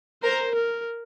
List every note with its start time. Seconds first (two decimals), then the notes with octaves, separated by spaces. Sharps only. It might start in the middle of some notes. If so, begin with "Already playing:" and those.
0.23 A#4 C5
0.55 A#4